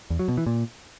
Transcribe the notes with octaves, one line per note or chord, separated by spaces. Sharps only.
E2
F#3
B2
E3
A#2